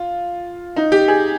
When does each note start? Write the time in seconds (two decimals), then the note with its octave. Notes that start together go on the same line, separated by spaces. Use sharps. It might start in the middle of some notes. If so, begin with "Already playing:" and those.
Already playing: F4
0.76 D#4
0.92 G4
1.08 G#4